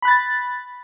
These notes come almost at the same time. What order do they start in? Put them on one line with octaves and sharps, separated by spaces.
B5 F#6 A6